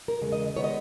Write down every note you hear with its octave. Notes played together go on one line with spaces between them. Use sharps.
A#4
E2 C#3 G#3
D#5
D#3 G#3 B3 C#5
D#5